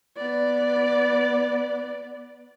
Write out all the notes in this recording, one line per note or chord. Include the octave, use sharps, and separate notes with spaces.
B3 D5